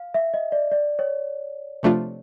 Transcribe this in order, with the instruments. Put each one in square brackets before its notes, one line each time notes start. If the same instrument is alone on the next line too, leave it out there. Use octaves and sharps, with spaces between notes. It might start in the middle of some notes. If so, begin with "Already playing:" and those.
Already playing: [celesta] F5
E5
D#5
D5
D5
C#5
[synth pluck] C3 F3 A3 D4 F4